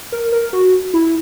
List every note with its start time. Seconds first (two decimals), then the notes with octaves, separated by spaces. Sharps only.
0.12 A#4
0.32 A#4
0.53 F#4
0.94 E4